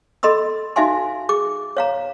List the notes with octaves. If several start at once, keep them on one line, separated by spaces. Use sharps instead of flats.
A4 D#5 B5 C6 E6
D#4 F#4 E5 F5 G#5 C6
G#4 D6
C#5 F5 A#5